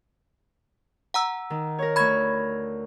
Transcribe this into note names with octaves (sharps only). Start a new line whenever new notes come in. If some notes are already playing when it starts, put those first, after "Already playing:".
F#5 A#5 E6
D#3
A#4 C#5
D2 B5 C#6 E6 G#6